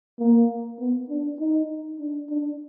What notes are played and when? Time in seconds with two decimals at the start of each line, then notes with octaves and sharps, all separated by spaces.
0.19 A#3
0.79 B3
1.09 D4
1.39 D#4
1.99 D4
2.29 D4